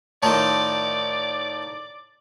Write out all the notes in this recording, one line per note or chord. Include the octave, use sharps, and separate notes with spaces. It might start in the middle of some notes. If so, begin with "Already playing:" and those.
A2 D#3 F4 D5 A5